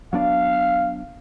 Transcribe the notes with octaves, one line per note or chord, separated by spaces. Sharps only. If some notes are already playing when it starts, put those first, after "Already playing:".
F#3 B3 D4 F5